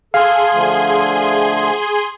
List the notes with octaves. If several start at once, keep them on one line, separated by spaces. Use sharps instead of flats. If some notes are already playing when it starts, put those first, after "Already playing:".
G#4 A4 F5 G#5 C6
D3 F3 A3